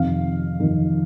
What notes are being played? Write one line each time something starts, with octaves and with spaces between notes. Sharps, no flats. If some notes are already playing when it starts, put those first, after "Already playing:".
Already playing: F2 C3 D#3 F5
F2 C3 D#3